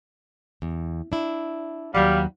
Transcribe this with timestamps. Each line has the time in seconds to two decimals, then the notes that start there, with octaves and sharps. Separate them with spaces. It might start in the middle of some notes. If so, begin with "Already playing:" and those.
0.62 E2
1.12 D4 E4
1.95 D#2 F#3 G3 F5 F#5